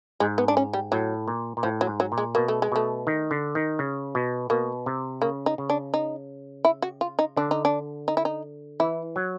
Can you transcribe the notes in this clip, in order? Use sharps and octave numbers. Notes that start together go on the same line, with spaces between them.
G#2 G#3
B3
D4
C#4
G3
A2 F#3
A#2
A#2
A2 F3
F#3
G#2
F#3
A#2
G#3
B2 A#3
A3
G#3
B2 A3
D#3
D3
D#3
C#3
B2
B2 A#3
C3
C#3 A#3
D#4
C#3
D4
D#4
E4
F#4
F4
D#4
D3 D4
D#4
D4
D#4
E4
D#4
E3 E4
F#3